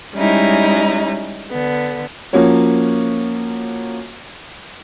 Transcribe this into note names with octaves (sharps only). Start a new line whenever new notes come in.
G3 G#3 C#4 D#4 E4
D3 B3
F3 A#3 C#4 F#4 C#5